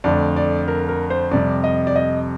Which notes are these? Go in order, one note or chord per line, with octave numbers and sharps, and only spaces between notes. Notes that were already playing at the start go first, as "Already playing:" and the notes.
F2 D3 A3 D5
D5
A#4
A#4
C5
F2 C3 G3 D5
D#5
D5
D#5